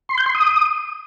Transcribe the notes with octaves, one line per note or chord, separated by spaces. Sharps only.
C6
G6
C6
D#6